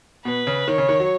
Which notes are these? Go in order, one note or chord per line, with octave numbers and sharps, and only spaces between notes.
B2 B4
C#3
D#3 C#5
C#3
D#3
F#3